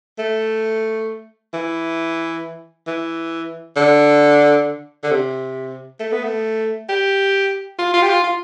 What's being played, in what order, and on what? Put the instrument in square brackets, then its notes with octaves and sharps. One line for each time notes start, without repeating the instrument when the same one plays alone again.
[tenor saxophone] A3
E3
E3
D3
D3
C3
A3
B3
A3
G4
F4
F4
G4
F4
F4